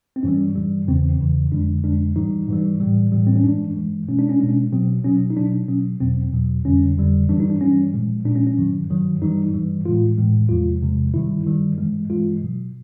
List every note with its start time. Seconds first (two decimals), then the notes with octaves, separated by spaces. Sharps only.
0.16 C4
0.23 G2 E3 G3 C#4
0.55 G2 E3 G3
0.87 E2 C#3 E3 C4
1.20 E2 C#3 E3
1.52 F2 D3 F3 G#3 D4
1.83 F2 D3 F3 G#3 D4
2.16 G#2 E3 G3 D#4
2.48 G#2 E3 G3
2.80 A2 E3 G3
3.12 A2 E3 G3
3.27 C4
3.36 C#4
3.44 G2 E3 G#3 D4
3.77 G2 E3 G#3
4.08 B2 G#3 C#4
4.19 D4
4.29 C#4
4.39 B2 G#3 D4
4.49 C#4
4.72 B2 F#3 C4
5.04 B2 F#3 C#4
5.30 D#4
5.37 B2 F#3 D4
5.68 B2 F#3 C#4
6.00 E2 B2 F#3 C4
6.33 E2 B2 F#3
6.65 F2 D3 G3 C#4
6.97 F2 D3 G3
7.29 G2 E3 G3 D4
7.40 D#4
7.50 D4
7.61 G2 E3 G3 C#4
7.93 A#2 F3 G#3
8.25 A#2 F3 G#3 D4
8.36 C#4
8.47 C#4
8.57 G2 D#3 F#3
8.90 G2 D#3 F#3
9.22 G2 E3 G3 D#4
9.54 G2 E3 G3
9.86 A2 E3 G#3 F4
10.18 A2 E3 G#3
10.49 E2 C3 F3 G#3 F4
10.82 E2 C3 F3 G#3
11.14 G2 D#3 G3 E4
11.46 G2 D#3 G3
11.78 G2 E3 G#3
12.10 G2 E3 G#3 F4
12.42 B2 F#3